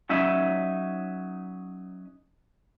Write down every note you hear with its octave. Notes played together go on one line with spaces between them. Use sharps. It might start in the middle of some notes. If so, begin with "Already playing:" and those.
F#3 C#4 D#4 E5